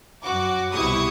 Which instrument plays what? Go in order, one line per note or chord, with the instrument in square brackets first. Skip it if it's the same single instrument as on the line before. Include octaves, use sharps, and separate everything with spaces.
[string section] F#2 F#4 D6
C2 B2 E4 G4 C#6 D#6